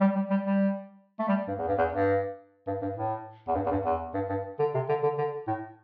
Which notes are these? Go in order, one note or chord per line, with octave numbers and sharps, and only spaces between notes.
G3
G3
G3
G3
A3
G3
G2
E2
G2
E2
G2
G2
G2
A2
E2
G2
E2
G2
E2
G2
G2
D3
C3
D3
D3
D3
A2